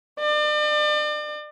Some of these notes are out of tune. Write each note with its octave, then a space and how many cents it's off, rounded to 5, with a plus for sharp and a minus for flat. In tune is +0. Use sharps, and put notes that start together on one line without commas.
D5 +40